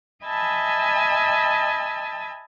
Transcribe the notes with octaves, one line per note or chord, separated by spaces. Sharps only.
D#5 E5 G#5 A5 B5 E6